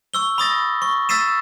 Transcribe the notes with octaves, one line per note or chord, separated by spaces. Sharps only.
C#6 E6 G7
B5 D#6 A6 A#6
C#6
E6 A6 B6 C7 D#7 E7